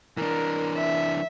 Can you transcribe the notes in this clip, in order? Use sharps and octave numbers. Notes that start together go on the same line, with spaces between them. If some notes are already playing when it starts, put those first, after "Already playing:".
E3 D4 A#4
E5